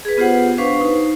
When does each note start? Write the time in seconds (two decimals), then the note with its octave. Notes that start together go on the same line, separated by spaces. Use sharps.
0.05 G#4 B4
0.17 B3 F4 G4 C5 F#5
0.58 D4 B4 C5 F5 C#6
0.81 D#4 C5